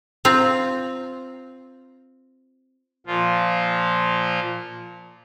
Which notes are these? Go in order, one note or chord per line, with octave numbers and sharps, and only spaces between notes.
C4 F4 A#5
A#2 F3 F4